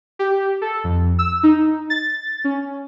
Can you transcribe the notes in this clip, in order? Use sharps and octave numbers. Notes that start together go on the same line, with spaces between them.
G4
A4
F2
E6
D#4
A6
C#4